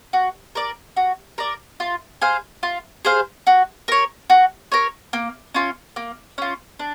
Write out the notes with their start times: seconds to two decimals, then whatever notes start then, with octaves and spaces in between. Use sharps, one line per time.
0.13 F#4
0.55 A#4 D5
0.96 F#4
1.38 A#4 D5
1.80 F4
2.22 G#4 C5 F5
2.63 F4
3.05 G#4 C5 F5
3.47 F#4
3.88 A#4 C#5
4.30 F#4
4.72 A#4 C#5
5.13 A#3
5.54 C#4 F4
5.96 A#3
6.38 C#4 F4
6.79 D4